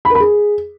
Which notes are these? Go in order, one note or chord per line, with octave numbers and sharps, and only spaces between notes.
B5
A#4
B5
G#4